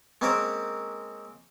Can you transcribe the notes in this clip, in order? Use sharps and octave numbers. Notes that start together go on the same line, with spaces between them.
G#3 A#3 C4 C#4 A#4 C5